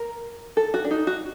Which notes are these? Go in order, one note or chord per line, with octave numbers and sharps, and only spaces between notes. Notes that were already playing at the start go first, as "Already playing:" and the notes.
Already playing: A#4
A4
F#4
D4
D#4
F#4